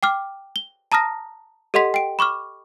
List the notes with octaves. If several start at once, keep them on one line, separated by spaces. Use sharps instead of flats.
G5 D6 F6
G7
A5 A#5 D#6 F6 A#6
G4 A4 D#5 F#5 C6 B6
G5 D7
B5 C#6 D6 F6